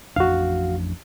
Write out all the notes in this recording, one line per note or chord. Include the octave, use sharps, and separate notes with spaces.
A1 F2 D4 F#4 F5